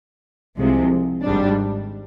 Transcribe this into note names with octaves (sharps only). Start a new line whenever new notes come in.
C2 C3 F3 G#3
G#1 G#2 G3 D4